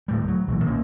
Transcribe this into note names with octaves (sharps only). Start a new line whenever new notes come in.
D1 A2 G3
F#3
B1 A#2 E3
D#3 A#3 C#4